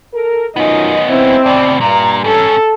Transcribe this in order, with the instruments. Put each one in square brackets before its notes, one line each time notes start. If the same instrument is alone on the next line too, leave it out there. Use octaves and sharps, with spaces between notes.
[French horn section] A4 A#4
[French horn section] F#2 D#4 F4 [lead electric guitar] B3 C#4 [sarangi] D#5
[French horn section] C4 [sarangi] E4
[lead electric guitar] D2 B2 [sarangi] D5
[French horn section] G2 [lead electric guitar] A#2 [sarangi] A#5
[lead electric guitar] G#2 C#4 [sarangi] A4